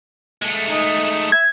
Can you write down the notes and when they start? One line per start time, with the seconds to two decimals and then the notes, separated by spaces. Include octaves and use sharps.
0.42 G#3 A3
0.70 D#4
1.32 E5 G#6